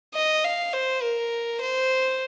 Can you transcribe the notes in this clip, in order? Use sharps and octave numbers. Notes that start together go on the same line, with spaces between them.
D#5
F5
C5
A#4
C5